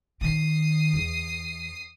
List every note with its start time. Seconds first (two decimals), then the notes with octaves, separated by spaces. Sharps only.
0.21 D#3 D#6 C7
0.94 E2